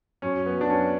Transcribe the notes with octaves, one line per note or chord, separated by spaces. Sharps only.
F#2 C#4
B3
F#2 D4
C#4